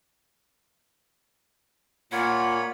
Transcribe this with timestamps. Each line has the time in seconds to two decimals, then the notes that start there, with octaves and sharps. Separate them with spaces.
2.12 A#2 A#3 F4 C#5 F#5 B5